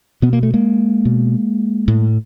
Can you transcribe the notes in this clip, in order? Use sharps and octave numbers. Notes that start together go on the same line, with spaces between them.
B2 B3
A#3
A3
G#3 A#3
B2
A2